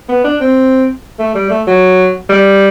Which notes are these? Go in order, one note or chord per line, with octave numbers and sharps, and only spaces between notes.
B3
D4
C4
A3
G3
A3
F#3
G3